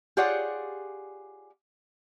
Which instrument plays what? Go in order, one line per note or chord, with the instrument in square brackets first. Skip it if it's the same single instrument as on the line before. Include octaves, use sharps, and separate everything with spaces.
[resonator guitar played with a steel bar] F4 G4 G#4 C#5 D5 F#5